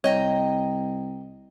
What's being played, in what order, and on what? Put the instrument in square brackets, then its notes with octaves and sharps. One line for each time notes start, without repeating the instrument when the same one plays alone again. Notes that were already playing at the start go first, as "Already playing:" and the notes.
[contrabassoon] C2 [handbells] C#5 [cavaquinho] D#5 G5 A#5